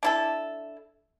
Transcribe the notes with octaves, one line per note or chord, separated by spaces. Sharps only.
D4 E4 A4